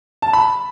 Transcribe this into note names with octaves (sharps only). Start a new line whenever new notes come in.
A5
B5